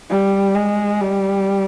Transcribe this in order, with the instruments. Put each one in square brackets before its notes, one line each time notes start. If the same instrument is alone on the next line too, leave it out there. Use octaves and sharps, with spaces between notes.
[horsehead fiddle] G3
G#3
G3